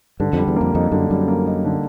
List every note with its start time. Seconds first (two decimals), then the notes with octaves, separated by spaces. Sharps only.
0.20 G2 D3
0.33 F2 G3
0.48 E2
0.56 F2 A#3
0.75 F2 D#4
0.92 F#2 D3
1.11 F#2 G3
1.28 A#3
1.46 D#4
1.65 D3